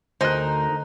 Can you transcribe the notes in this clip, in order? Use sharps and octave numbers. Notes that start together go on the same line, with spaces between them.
D2 D#4 A#4 C5 F#6